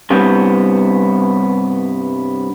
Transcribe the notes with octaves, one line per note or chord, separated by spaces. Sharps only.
G2 C3 B3